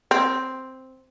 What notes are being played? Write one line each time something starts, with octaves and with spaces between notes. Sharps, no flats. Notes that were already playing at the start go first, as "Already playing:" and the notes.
C4